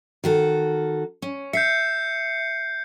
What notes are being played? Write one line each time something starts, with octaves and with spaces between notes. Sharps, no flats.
D#3 F#4 A4
C#4
E5 G6 C7 C#7